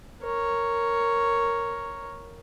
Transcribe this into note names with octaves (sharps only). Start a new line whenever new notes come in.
A#4 C#5